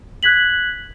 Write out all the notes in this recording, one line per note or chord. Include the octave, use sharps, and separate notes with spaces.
F#6 G#6 B6 F#7